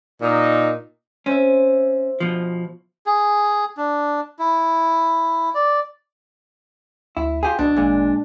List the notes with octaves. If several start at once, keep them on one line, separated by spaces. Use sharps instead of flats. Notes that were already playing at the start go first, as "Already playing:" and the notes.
A#2 D#4
C4 C#4 E5
B2 F3
G#4
D4
E4
D5
D2 E4
F4 G4 G#4
C2 B2 D4
G#1 A#2 G#3